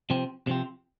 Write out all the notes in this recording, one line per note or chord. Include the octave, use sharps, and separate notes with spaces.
C3 F3 C4
C3 F3 C4